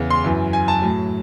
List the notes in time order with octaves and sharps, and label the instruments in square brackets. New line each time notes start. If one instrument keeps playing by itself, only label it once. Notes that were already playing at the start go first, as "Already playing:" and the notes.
Already playing: [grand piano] E2 C#3 E3
C6
F#2 E3
G#5
A5
A2 F#3